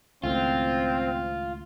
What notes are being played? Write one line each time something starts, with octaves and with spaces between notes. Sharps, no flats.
C#2 A2 D#3 C4 F4